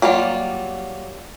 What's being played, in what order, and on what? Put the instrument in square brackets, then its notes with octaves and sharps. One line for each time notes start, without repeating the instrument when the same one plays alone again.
[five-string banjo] F#3 G3 A#3 F4